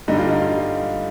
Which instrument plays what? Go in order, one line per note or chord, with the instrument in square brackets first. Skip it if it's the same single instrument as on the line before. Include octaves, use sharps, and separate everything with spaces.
[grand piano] G2 D3 G3 D#4
F4
D#4
F4